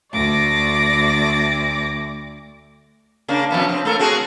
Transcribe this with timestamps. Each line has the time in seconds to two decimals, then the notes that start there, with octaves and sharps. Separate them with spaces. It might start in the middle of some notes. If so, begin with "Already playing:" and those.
0.12 D2 D5 D6 A#6
3.28 C#3 A#3 D4
3.51 F2 C3 B3
3.69 C4
3.85 A3 A4 A#4
3.99 C4 F#4 G#4